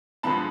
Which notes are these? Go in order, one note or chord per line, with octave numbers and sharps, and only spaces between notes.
G2 D3 F3 G#3 B3 A5 B5